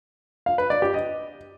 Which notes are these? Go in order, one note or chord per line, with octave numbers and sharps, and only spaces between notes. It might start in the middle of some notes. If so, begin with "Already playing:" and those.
F5
B4
D5
G4
D#5